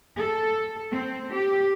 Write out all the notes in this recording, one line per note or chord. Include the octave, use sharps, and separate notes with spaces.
A4
C4
G4